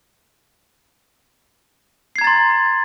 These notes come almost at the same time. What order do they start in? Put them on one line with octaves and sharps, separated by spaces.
C7 G#6 A#5 A6 C6